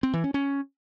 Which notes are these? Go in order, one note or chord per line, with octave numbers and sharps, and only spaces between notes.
C4
E3
C#4
C#4